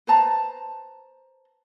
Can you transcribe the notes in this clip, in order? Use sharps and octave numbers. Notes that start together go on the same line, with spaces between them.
B4 C5 A5 A#5